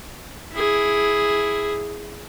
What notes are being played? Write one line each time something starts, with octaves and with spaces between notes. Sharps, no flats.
E4 G#4